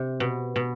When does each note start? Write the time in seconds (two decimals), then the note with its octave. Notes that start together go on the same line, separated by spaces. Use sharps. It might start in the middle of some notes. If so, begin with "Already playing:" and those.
Already playing: C3
0.20 B2
0.56 B2